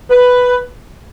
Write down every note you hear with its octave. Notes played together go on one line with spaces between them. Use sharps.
B4